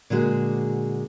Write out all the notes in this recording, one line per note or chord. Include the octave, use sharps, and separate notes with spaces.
A#2 D3 G#3 F#4 G#4